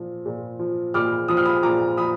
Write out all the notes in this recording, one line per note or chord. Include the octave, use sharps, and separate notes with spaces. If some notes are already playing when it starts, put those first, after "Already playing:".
Already playing: A#2 F3
A#2
F3
A#2 D6 F6
F3 D#6
F6
B5 D#6
A#2 A#5 D6
F3 B5 D#6